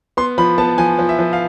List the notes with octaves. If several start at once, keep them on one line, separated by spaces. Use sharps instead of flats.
B3 C6
F3 B5
B3 A5
F3 G#5
F3
E5
F3
F5